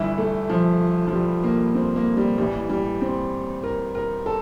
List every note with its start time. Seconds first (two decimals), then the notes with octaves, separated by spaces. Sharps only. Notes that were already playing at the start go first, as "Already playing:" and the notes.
Already playing: G1 G2 E3 E4
0.18 A3
0.50 F3
1.07 F3
1.12 G3
1.44 A#3
1.75 C4
1.96 A#3
2.17 G3
2.38 A1 A2 E3 G3
2.70 G3
3.01 C4
3.63 A#4
3.95 A#4
4.26 A4